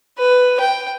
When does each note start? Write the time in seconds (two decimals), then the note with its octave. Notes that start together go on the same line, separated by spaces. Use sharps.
0.18 B4
0.60 G5